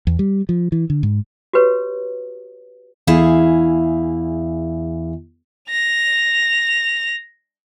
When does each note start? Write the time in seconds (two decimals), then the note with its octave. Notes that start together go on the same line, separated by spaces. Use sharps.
0.07 E2
0.19 G3
0.49 F3
0.72 E3
0.90 D3
1.03 G#2
1.53 F#4 G4 B4 C#5
3.07 E2 E4 G#4 F5
5.70 A#6 F7